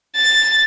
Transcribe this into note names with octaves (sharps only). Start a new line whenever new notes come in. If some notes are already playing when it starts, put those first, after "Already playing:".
A6